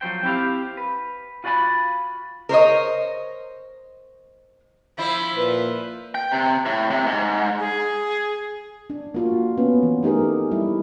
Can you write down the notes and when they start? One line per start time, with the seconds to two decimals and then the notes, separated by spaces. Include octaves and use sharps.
0.01 F3 F#3 A#3 C5 G5
0.23 C4 E4 G4 F5
0.77 B4
1.44 F4 F#4 D5 G#5 B5
2.49 A#4 C5 C#5 D#5
4.98 F3 E4 C5 B5
5.35 A#2 B4
6.15 G5
6.32 C3
6.66 A2
6.91 C3
7.07 G#2
7.59 G#4
8.90 D4
9.14 A#3 F4 F#4
9.58 B3 C#4
9.83 E3
10.03 A3 D#4 G4 G#4 A#4
10.51 G3 E4